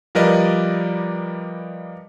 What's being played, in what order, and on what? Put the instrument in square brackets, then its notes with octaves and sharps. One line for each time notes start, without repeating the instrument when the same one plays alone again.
[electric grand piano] F3 G3 A#4 B4 D5 D#5